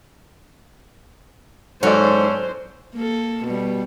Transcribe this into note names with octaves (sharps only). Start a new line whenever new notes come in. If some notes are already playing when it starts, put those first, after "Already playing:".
G#2 F#3 C#4 A4 C5 D5
A#3 A4
B2 G3